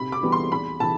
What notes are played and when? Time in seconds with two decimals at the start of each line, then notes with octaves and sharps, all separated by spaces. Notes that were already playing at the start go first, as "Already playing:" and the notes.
Already playing: C3 B5
0.12 D6
0.23 E3 G3 B3
0.32 C6
0.51 E2 B5
0.80 C3 E3 A5